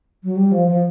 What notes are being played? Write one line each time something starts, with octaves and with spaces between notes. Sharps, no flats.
F#3
G3
F3
F3